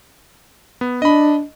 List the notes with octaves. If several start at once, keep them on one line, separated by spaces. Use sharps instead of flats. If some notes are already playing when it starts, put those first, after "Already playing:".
B3
D4 D#5 B5